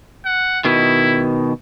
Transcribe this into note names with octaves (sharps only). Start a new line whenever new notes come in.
F#5
B2 D#3 E4